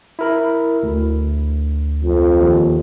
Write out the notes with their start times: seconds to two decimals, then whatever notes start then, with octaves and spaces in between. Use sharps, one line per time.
0.19 E4 A#4 B5
0.83 D2
2.03 F2
2.40 D#2